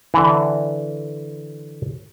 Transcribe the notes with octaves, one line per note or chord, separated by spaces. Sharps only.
D3 E3